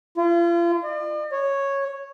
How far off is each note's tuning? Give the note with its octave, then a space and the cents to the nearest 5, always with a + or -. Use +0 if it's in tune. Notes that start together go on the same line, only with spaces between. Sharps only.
F4 -35
D5 +45
C#5 -5